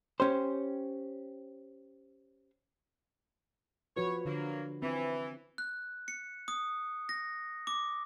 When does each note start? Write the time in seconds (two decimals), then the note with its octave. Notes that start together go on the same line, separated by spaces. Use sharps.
0.20 C#4 G4 C5
3.97 F3 F#4 B4 C#5
4.25 D3 F#3 A#3
4.82 E3 C4
5.58 F#6
6.08 C#7
6.48 D#6
7.09 A#6
7.67 D6